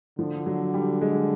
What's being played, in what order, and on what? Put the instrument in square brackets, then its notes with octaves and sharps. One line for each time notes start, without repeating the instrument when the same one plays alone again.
[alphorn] D3 [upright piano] F3
[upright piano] F#3
G3
G#3